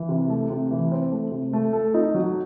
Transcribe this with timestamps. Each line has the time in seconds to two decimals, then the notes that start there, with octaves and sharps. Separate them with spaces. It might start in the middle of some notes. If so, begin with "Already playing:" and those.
Already playing: E3
0.09 C3
0.30 A3
0.50 C3
0.71 E3
0.92 C4
1.12 A3
1.32 C3
1.53 A3
1.73 A4
1.94 D#4
2.15 F#3